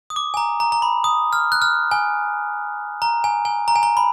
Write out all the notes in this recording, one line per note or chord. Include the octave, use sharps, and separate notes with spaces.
D#6
D6
G#5
A#5
A#5
A#5
B5
D#6
F6
F#6
F6
G#5
A#5
G#5
G#5
A#5
G#5
A#5
B5